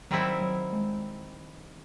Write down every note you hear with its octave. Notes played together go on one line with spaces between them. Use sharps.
D#3 F#3 G3 C4 E4
F#3
G#3